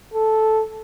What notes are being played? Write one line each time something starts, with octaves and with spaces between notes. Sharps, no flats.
A4